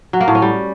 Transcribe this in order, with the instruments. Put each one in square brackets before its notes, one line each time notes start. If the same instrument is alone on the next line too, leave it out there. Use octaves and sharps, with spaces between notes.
[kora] F#3
A#3
A2
C#4
G3